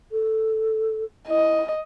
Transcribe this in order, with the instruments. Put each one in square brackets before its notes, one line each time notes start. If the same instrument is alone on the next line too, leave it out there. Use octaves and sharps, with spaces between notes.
[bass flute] A4
[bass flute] E4 [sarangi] D#5